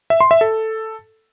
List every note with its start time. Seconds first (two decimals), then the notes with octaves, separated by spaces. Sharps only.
0.10 E5
0.21 C6
0.31 E5
0.41 A4